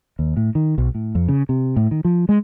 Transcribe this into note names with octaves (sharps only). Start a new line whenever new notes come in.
D#2
A2
D#3
B1
A2
F2
C#3
C3
A2
D#3
F3
G#3